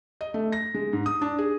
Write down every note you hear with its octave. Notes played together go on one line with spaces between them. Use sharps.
D#5
A3
A#6
G#3
G#2
D#6
D4
G#4